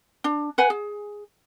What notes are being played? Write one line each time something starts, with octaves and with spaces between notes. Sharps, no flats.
D4
B4 F#5 G#5
G#4